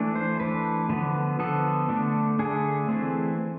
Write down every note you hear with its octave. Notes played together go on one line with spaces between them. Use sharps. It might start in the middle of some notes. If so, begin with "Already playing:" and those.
Already playing: E3 A3 D4
C5
E3 A3 D4 B4
D3 F3 B3
D3 F3 B3 A4
D3 A3 D4
D3 A3 D4 G#4
E3 A3 C4